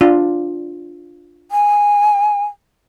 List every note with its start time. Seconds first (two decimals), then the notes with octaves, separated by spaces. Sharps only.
0.01 D4 F4
1.51 G#5